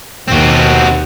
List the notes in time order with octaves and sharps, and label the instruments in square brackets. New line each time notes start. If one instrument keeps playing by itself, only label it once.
[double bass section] D#2 B2 [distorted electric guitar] C4 F#4